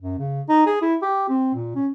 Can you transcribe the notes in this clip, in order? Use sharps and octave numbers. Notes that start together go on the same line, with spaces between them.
F#2
C#3
D#4
G#4
E4
G4
C4
A#2
C#4